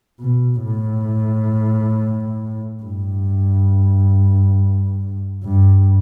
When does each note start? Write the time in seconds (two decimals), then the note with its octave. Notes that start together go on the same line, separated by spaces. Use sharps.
0.20 B2
0.64 A2
2.83 G2
5.44 G2